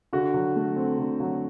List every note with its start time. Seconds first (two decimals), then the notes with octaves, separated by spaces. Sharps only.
0.13 D3 F#4
0.34 F#3
0.56 A3
0.76 C4
0.98 D3
1.20 F#3